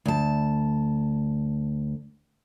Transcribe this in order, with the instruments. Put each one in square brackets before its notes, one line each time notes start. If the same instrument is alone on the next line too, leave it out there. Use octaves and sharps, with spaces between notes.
[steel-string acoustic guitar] D2 A5